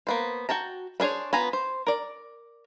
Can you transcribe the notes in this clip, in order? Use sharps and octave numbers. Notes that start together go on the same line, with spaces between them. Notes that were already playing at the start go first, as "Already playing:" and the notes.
A#3 B3 C5
F#4 G5 A5 A#5
B3 D4 G#4 C5 C#5
B3 F4 G#5 A#5
C5
A#4 D5